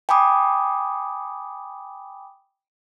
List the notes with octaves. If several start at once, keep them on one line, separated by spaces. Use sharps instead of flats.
G5 G#5 B5 D6 D#6